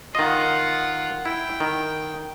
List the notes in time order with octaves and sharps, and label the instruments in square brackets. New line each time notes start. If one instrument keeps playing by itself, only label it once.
[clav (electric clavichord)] D#3 D#5 [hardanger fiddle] F4 F#5
[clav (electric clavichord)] E4 [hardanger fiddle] G5
[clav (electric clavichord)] D#3